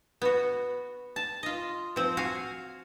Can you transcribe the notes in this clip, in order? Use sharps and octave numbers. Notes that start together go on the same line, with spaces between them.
B3 F#4
A5
F4 D#5
F3 C4
F#4 F5 G#5